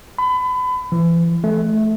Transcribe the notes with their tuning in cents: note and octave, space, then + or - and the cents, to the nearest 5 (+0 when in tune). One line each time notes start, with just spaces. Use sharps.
B5 +30
E3 +35
A3 -15